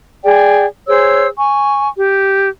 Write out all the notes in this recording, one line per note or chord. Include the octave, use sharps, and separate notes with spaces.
G#4 D5 G5
G#4 C5 C#5 E6
G#5 C#6
G4